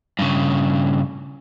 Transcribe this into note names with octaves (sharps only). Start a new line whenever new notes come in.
G2 C#3